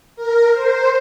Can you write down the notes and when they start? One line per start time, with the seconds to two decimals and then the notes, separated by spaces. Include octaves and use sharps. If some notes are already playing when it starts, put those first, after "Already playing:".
0.16 A#4
0.52 C5